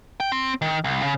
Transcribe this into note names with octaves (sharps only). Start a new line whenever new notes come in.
G5
C4
D#3
C2
C#3